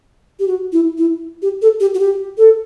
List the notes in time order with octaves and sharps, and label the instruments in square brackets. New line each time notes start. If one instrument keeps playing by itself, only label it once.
[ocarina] G4
F#4
E4
E4
G4
A4
G4
F#4
G4
A4